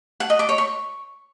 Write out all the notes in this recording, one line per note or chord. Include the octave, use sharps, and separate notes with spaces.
F#5
D#5
D6
C#5
C#6